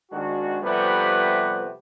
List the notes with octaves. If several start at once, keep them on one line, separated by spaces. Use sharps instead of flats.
G#1 D#3 G#3 D4 F#4
C3 F3 G3 A3 B3 B4